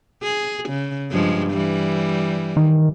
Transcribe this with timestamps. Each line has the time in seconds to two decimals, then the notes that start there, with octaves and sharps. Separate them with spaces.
0.23 G#4
0.69 C#3
1.11 G2 F3 G#3
1.52 E3 G3
2.57 D#3